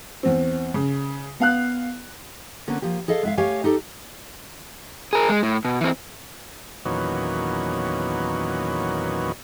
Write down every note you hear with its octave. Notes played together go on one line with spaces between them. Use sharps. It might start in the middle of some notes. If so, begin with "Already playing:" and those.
E2 C4
C#3
B3 F5 F#6
D3 A#3 B3 C#4
F3 A#3 G4
G#4 A4 D#5 F5
G#3 E5 F5
A3 G4 C#5 F5 G#5
D#4 G4 A4
G#4 A#4
G#3
A2
B2
E3 C4
E2 A#2 D#3 F#3 B3 C#4